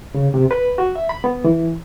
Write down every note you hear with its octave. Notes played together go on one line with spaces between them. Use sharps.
C#3
C3
B4
F#4
E5
B5
B3
E3